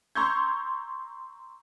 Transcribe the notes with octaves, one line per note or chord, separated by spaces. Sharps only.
A#5 C6 C#6 E6 G6 G#6